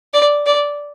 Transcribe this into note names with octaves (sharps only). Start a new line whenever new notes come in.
D5
D5